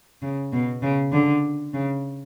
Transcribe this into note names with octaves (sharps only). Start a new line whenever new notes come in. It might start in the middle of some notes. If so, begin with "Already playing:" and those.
C#3
B2
C#3
D3
C#3